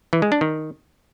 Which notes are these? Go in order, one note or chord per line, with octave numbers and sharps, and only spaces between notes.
E3
G#3
D4
D#3